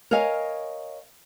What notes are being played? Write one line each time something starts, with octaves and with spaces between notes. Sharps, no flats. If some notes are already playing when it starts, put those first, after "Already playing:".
A#4 C#5 D#5 F5 G#5